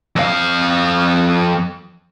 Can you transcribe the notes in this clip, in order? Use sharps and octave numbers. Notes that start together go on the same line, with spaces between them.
F2 F5